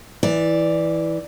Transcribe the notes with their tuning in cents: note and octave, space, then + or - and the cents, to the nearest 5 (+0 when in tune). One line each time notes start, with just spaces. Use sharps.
E3 -10 D5 +0